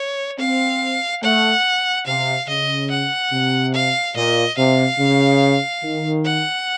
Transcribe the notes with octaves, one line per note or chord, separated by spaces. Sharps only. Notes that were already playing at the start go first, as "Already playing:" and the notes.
Already playing: C#5
C4 F5
A3 F#5
C3 F5
C#3 D#5
F#5
C3
F5
A#2 D#5
C3 F5
C#3
D#3
F#5